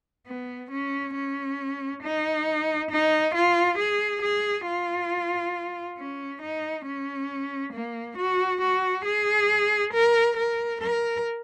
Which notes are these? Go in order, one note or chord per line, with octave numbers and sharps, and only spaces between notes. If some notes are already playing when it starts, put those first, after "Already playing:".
B3
C#4
C#4
D#4
D#4
F4
G#4
G#4
F4
C#4
D#4
C#4
A#3
F#4
F#4
G#4
A#4
A#4
A#4